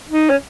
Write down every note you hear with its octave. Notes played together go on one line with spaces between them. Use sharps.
D#4
C#4